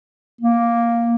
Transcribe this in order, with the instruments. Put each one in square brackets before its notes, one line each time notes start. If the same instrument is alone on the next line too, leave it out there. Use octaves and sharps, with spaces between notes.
[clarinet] A#3